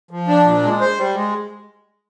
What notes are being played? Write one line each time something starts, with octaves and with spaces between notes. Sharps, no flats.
F3
D4
A#2
G#3
C5
G3
G#3